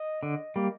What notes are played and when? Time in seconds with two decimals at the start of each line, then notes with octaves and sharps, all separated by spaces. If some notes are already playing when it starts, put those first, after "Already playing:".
Already playing: D#5
0.23 D3
0.56 G3 A#3